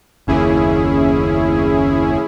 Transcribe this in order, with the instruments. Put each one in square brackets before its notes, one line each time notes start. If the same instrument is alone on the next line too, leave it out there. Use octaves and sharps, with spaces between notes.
[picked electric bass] F#1 D#2 [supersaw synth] C#4 E4 G#4